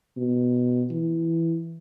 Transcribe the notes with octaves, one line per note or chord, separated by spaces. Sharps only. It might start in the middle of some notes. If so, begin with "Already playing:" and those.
B2
E3